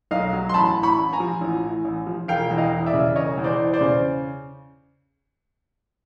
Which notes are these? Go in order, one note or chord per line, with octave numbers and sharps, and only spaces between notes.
B1 D#5 F5
F#3
C6
A1 A5 B5
A2
B5 C#6
A1
G#5 A#5
F3
A1
A2
A1
F3
E1 F5 G5
E2
D#5 F5
E3
D5 E5
C#3
E1 C#5 D#5
E2
C5 D5
E3
C5 D5
C#3